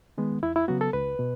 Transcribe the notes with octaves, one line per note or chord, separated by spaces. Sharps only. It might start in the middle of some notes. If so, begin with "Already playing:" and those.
D#3 G#3 B3
E2 E4
E4
C#3 F#3 B3 F#4
A4
C#2 B4
B2